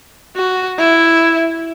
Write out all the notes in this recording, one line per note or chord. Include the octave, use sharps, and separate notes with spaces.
F#4
E4